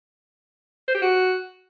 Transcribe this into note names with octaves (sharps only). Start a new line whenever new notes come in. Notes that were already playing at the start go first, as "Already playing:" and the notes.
C5
G4
F#4